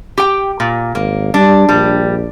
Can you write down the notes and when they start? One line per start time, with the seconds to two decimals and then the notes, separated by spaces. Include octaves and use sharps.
0.18 G4 G5
0.60 A#2
0.95 G#1 A#3
1.34 G3 D4
1.69 A#1 G3